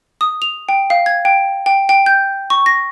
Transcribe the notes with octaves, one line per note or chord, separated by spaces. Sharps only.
D#6
F7
G5
F5
G#6
G5
G5
G5
G6
C#6
A#6